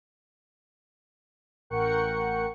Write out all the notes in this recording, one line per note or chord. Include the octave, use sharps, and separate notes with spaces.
A1 A#4 F#5 G5 C#6 C#7